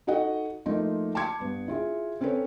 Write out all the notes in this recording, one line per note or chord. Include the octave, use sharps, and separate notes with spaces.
D#4 F#4 A4 D#5 F#5
F3 A3 A#3 D#4 F4
A5 C6 D6 G#6 C#7
G2 B3
E4 F4 G#4
C4 C#4 A4 B4 C#5